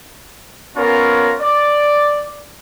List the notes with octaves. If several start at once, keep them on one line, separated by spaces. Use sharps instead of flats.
B3 C#4 F4 A#4 C#5
D5